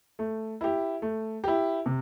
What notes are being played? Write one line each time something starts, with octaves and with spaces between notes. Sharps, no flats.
A3
E4 G4
A3
E4 G4
C3